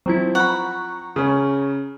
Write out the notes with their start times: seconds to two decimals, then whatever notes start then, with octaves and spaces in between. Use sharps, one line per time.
0.06 F3 F#3 C4 E4
0.35 F#5 A#5 B5 C#6
1.16 C#3 C#4